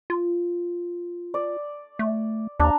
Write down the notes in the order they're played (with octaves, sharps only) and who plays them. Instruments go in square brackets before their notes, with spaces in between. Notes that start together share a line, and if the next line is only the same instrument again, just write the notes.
[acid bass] F4
[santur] D5
[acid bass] A3
[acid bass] D#2 [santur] D4 A#5